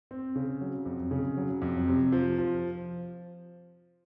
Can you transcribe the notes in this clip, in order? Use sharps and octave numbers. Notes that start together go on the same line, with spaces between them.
C4
C#3
F#3
F2
C#3
F#3
F2
C3
F3
F3